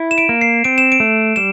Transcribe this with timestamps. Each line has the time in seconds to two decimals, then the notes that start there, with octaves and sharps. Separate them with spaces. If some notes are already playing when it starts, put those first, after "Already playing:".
Already playing: E4
0.11 E7
0.18 D7
0.29 A#3
0.41 C7
0.64 C4 D7
0.78 E7
0.92 D7
1.00 A3
1.36 G3 E7